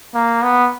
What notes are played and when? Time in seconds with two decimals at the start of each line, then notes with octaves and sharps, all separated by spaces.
0.14 A#3
0.43 B3